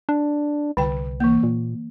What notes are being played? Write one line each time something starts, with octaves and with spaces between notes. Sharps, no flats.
D4
C2 D3 G5
E3 A#3
A#2